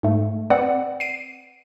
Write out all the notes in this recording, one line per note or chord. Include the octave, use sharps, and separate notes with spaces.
G#2 A3
C4 B4 D5 F#5
C7 D7 D#7